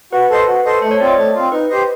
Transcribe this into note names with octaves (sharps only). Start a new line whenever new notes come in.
F#4 B4
A4 C5 D#5
F#4
A4 C5 D#5
A3 C5
C#5
C4 F4 D5
D#5
A3
C4 F4
D#4 B4
G4 C5 D#5